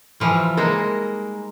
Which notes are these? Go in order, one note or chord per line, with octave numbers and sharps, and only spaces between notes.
E3 F3 G3
G#3 A#3 D#4 A#4